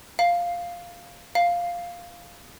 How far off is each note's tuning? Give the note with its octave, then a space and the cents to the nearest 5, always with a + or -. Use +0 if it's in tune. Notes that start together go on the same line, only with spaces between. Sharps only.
F5 +0
F5 +0